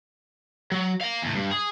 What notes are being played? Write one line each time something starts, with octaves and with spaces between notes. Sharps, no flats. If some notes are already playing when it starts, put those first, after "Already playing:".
F#3
F5 A#5
E2 A2
G2
G#4